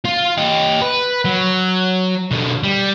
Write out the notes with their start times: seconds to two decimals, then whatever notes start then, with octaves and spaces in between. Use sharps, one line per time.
0.05 F4
0.38 G4 D#5
0.82 B4
1.25 F#3
2.31 B2 D3
2.63 G3